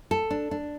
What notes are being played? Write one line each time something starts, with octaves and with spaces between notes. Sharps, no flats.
A4
D4
D4